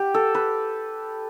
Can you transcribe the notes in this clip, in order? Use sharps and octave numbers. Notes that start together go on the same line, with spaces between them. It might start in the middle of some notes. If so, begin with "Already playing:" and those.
Already playing: G4
A4
B4